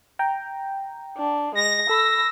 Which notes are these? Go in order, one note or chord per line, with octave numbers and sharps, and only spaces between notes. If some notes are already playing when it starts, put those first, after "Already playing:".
G5 A#5
D4
G#3 A#6
A4 B5 E6